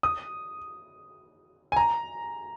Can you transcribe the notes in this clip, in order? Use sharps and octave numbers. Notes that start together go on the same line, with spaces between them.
D#6
G#5
A#5